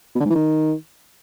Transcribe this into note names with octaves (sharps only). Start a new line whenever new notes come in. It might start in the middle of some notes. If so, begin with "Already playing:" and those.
B2
D3
G#2
E3
D#3